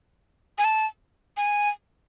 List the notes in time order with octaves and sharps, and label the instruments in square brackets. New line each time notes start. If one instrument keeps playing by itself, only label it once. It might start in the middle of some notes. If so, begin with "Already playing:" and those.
[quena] G#5
A5
G#5